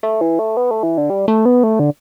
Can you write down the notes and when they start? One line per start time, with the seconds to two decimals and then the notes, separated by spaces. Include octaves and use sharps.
0.03 A3
0.21 E3
0.39 A3
0.57 B3
0.71 A3
0.83 E3
0.98 D3
1.10 G3
1.28 A3
1.45 B3
1.64 A3
1.79 D3